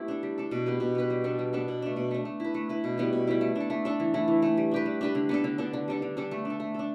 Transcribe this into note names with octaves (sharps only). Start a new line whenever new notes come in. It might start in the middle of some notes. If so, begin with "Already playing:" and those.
Already playing: A3 B3 E4 G4
D4 A4
G3
D4 A4
B2
B3 G4 B4
B2
B3 G4 B4
G3
B3 D4 A4
G3
B3 D4 A4
B2
A3 D4
B2
A3 D4
A3
E4 B4
A3
E4 B4
B2
G3 B3 E4
B2
G3 B3 E4
A3
D4 A4
A3
D4 A4
E3
A3 E4
E3
A3 E4
G3
D4 G4 B4
G3
D4 G4 B4
D3
B3 D4 A4
D3
B3 D4 A4
D3
G3 D4 A4
D3
G3 D4 A4
A3
D4 A4
A3
D4 A4